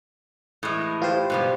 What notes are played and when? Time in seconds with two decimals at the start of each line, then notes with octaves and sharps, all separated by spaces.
0.63 A2 E3 G#3
1.02 F4 G4 C5
1.30 G#2 B2 G3